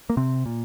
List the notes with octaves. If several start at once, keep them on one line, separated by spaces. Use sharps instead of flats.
A#3
C3 C4
A#2